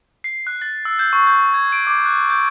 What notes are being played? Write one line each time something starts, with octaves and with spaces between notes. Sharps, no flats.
C7
F#6
A6
E6
G6
C#6
G6
G#6
D7
D6
F#6
G6